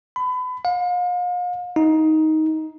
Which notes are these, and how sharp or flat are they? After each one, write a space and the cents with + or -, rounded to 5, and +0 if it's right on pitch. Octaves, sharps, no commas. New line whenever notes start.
B5 +30
F5 +40
D#4 +15